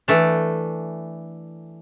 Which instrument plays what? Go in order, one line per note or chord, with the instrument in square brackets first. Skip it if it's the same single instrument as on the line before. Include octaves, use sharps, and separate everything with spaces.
[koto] E3 A3 D4